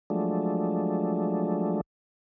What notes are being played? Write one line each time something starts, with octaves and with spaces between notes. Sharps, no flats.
F3 F#3 G#3 A3 D4